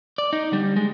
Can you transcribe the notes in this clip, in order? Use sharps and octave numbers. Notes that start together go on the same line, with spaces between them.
D5
D#4
D3 G3
G#3